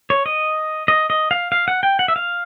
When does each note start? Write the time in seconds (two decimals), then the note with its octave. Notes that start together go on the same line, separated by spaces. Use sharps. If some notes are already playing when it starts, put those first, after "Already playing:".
0.10 C#5
0.26 D#5
0.88 D#5
1.10 D#5
1.31 F5
1.52 F5
1.68 F#5
1.83 G5
1.99 F#5
2.08 E5
2.16 F5